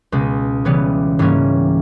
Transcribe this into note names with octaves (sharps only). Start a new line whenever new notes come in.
C#2 B2 G#3
C#3 E3 G3 B3
G#2 E3 G3 A#3 C#4